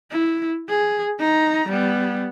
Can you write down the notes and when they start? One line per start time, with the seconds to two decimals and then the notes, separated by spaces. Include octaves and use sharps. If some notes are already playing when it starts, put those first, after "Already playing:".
0.11 E4
0.69 G#4
1.20 D#4 A#5
1.69 G3 B3